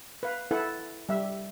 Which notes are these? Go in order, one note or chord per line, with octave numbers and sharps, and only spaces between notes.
B4 F5
E4 A4 B4 F#5
G3 E5